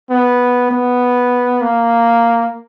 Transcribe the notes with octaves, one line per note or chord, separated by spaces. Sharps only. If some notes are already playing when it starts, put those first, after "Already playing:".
B3
B3
A#3